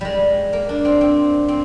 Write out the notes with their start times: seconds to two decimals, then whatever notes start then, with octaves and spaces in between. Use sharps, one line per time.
0.01 G3 G#3
0.53 A#3
0.69 D4
0.85 C4
1.01 C4
1.48 C4